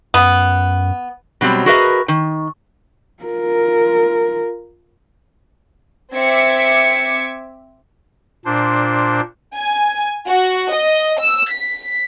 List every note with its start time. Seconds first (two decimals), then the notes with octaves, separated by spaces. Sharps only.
0.14 F#2 B3
1.41 B2 F#3 G3 C4
1.66 F#4 G#4 A#4 B4 D#5 E5
2.08 D#3
3.24 F4 A#4
6.15 C4 E5 D6 G#6 B6 C#7
8.45 A#2 D4 C5
9.56 G#5
10.28 F#4
10.72 D#5
11.20 E6
11.51 B6